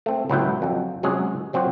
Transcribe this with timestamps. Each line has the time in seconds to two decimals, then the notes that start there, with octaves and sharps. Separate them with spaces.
0.06 A3 C4
0.30 C#2 A2 F#3 B3 E4 G5
0.62 F2 F#3
1.03 C3 F#3 G#3 C#4 G#4
1.53 F3 F#3 C4 F4 F#4